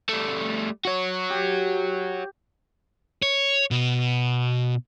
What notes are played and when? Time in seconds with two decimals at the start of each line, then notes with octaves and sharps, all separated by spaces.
0.09 G3 A3
0.85 F#4 C#5
1.30 G4
3.22 C#5
3.71 B2